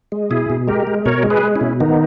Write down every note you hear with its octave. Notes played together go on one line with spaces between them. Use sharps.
G#3
B2 E4 G#4
B2
G#3 G4 A#4
G#3
B2 A#4 C#5
G#3
G#4 B4
G#3
C#4 E4
B2
D#3 B3 D#4